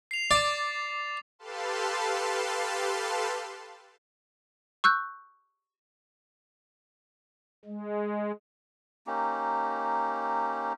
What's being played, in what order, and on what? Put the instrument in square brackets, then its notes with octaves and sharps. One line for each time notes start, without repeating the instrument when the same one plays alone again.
[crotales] C7 F7
[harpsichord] D5 [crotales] D6 A6
[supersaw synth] G4 A4 B4 F5 A5 C6
[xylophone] C#6 E6 F#6 G6
[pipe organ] G#3
[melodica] A#3 C#4 D#4 G4